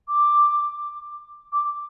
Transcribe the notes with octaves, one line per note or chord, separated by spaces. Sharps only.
D6
D6